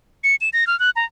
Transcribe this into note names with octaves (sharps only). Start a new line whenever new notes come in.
C#7
E7
A#6
F6
F#6
A#5